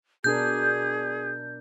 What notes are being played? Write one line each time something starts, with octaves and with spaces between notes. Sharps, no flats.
B2 D4 G#4 A#4 G6